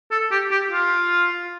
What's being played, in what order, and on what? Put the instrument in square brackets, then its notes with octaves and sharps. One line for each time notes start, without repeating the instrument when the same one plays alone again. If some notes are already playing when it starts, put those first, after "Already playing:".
[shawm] A4
G4
G4
F4